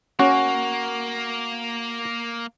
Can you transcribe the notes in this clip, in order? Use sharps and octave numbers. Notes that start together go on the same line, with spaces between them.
A#3 C#4 F#4